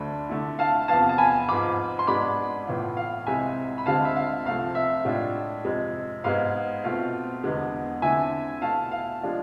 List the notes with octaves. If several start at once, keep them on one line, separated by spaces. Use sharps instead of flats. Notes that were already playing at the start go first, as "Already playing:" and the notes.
Already playing: D2 D3 A3 D4 B5
D3 A3 E4
F5 A5
E2 C3 F3 B3 F5 A5
A5
G#5 B5
G#2 F3 B3 F4 B5 D6
C6
G#2 G#3 B3 D4 B5 D6
A2 E3 B3 F4
F5
C2 C3 G#3 C4 E4 E5 G#5
B5
D2 D3 G#3 C4 F5 A5
E5
F5
C2 C3 F3 A3 C4 F5
E5
A2 G#3 D4 F4
F2 C3 G#3
G#2 G#3 B3 F5
B2 A3 C4 F4
E2 D3 G#3 B3
D3 A3 C4 E4 E5 G#5
B2 A3 E4 F5 A5
F5
F3 G#3 D4 F4